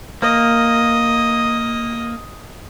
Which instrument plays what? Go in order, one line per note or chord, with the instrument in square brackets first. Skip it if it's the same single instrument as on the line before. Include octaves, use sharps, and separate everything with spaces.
[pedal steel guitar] A#3 [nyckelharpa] D#5